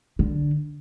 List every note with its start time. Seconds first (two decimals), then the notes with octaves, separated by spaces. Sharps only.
0.19 D3